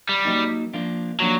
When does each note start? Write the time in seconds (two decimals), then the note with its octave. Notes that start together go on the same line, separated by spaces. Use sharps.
0.09 G3
0.25 F#3 A#3 D#4
0.73 F3 A#3 D4 F4
1.20 F3 F#3 A#3 D4 F4